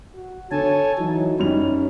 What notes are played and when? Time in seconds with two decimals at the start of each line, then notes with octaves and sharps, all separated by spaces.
0.14 F#4
0.51 D3 A4 C#5 G#5 A5
0.99 E3 F#3 D#4
1.39 F#2 G3 C#4 D#4 F7